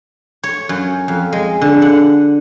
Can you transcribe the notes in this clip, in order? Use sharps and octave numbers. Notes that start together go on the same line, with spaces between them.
C#5
F#2
F2
G#3
D3
F#5